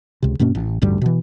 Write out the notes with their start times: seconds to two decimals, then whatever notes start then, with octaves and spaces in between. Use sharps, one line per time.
0.22 C#2 C3
0.39 G2 B2 A#3 C#4
0.55 A1
0.82 A1 D2 G2 G3
1.01 B2 E3